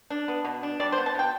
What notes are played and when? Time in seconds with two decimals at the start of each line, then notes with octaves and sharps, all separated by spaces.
0.10 D4
0.28 B3
0.45 B2
0.63 D4
0.80 G3 D5
0.92 C5
0.98 B3
1.06 A5
1.15 B2 G5